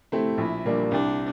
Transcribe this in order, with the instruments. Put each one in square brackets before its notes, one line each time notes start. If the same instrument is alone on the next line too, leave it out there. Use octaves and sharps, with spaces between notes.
[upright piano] A3 C4 E4 G4
[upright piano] A#1 [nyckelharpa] E4
[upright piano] A#2 G3 A#3 D4
[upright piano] C2 [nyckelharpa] D4